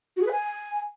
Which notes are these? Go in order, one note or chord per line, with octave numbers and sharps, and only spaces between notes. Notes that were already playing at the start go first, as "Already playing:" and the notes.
F#4
G#4
B4
G#5